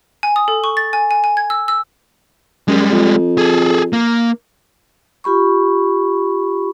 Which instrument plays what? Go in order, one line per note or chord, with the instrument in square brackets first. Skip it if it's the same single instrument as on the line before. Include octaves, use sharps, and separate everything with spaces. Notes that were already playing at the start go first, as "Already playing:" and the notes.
[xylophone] G#5
D#6
A4
C#6
A6
G#5
G#5
G#5
G#6
E6
E6
[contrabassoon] F#2 [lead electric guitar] G3 G#3
[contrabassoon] F2
[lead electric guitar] G#4 A4
A#3
[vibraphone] F4 G4 B5 C#6